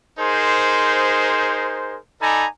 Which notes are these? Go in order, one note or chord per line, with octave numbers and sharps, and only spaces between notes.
D#4 G#4 A#4 C5
D#4 A4 D5 G#5 A#5 B5